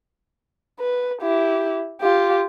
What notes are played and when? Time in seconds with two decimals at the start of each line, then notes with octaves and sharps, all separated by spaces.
0.80 B4
1.22 E4 G4
2.01 F4 G4